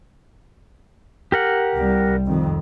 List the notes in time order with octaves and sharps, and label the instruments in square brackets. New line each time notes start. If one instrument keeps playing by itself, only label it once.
[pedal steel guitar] G4 A#4 F#5
[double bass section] C2 G3
F2 D#3